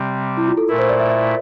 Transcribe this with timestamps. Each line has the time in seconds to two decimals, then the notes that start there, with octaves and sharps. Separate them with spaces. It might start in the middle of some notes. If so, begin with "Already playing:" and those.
Already playing: C3 G3 C4
0.37 E4
0.48 F4
0.57 A4
0.68 A#2 A3 E4 A#4
0.78 C5
0.89 D5
1.00 E5
1.10 E5